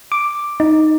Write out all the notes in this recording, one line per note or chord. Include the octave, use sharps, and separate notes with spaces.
D6
D#4